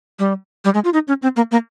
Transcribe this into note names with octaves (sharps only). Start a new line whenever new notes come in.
G3
G3
G#3
F4
D#4
C#4
C4
A#3
A#3